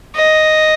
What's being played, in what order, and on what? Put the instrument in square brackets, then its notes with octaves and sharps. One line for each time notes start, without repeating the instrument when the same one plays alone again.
[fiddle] D#5